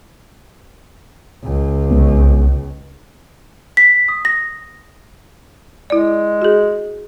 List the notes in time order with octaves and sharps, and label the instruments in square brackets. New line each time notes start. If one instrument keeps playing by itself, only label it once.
[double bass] C#2
[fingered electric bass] C2 G#3 B3
[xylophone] B6
D#6
A#6
[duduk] G#3 [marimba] E4 D5
[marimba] F#4 G#4